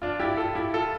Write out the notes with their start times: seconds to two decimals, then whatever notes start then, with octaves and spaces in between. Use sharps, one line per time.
0.02 D4 F4
0.19 E4 G4
0.37 F4 A4
0.55 E4 G4
0.74 F4 A4